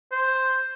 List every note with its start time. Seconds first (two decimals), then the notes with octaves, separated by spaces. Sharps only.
0.12 C5